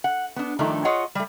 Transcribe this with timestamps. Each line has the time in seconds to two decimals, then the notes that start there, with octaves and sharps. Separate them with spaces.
0.04 F#5
0.36 B3 D4
0.59 G2 D#3 F3 A3 D4 D#4
0.85 F4 G#4 C#5 D#5 F#5
1.15 G3 A3